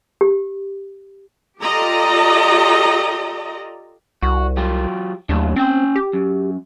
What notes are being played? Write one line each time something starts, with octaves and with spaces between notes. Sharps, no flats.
G4
F4 G4 A4 D5 D#5 A#5
C2 F#4
F#3 F4 G4
D#2 F#3 A3 D4
C4 C#4 G5
G4
F#2